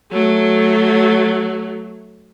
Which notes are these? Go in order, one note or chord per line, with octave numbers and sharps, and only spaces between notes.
F#3 A3